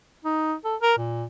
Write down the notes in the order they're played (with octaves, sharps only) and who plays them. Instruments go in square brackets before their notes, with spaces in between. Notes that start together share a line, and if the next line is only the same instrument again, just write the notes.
[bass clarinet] D#4
A4
A#4
A#2